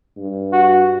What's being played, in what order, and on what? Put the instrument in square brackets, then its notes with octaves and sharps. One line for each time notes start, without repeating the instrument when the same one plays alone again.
[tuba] G2
[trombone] F#4